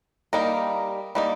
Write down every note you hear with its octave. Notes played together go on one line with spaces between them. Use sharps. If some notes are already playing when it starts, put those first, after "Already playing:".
G3 A#3 D#4 A#4
G3 A#3 D#4